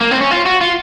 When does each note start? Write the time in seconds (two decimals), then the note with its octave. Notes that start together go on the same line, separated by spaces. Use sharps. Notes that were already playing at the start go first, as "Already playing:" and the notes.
0.01 A#3
0.11 C4
0.21 C#4
0.31 F4
0.46 F#4
0.61 F4